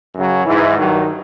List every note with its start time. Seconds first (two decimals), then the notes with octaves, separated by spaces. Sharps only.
0.15 F#2 C#3 F#3
0.45 G#2 E3
0.76 G2 D#3 F#3